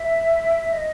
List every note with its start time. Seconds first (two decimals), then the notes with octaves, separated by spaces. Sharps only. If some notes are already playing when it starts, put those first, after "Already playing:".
Already playing: E5
0.73 D#5